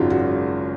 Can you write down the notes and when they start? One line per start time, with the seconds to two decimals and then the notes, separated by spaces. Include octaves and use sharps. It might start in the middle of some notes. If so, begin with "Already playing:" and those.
Already playing: G#1 F#2 C#3 F#3 F4 F#4
0.10 F#4